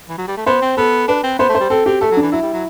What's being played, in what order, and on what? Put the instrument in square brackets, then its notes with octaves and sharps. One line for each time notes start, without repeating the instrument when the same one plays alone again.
[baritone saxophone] E3
F#3
G3
A3
[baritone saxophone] B3 [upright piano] C5
[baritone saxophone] C4
[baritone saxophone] B3 [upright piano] A4
[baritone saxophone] D4 [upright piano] B4
[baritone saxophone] C4
[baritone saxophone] B3 [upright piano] C5
[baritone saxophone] A3
[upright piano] C5
[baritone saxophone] G3
[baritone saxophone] C4 [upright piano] A4
[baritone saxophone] C4 [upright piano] G4
[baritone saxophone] A3 [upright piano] A4
[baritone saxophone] F#3
[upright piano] D4
[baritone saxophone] E3
[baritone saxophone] F#3 [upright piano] E4
[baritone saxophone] G3
F#3